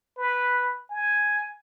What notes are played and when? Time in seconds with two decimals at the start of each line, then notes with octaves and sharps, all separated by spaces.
0.18 B4
0.90 G#5